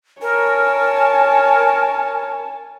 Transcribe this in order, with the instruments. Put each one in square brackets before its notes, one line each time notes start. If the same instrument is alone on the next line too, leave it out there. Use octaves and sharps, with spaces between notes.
[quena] A#4 [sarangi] C#5 [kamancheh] G#5 A5